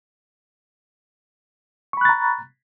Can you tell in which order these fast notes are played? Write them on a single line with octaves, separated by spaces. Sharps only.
C#6 B5 F#6 A6 A#5